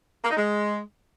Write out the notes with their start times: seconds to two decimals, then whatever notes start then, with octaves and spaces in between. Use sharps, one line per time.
0.24 A#3
0.31 D#4
0.37 G#3